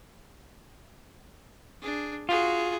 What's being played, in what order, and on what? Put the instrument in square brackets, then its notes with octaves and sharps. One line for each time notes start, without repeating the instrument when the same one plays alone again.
[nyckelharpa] D4 G#4
[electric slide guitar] F4 [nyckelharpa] F#4 G#4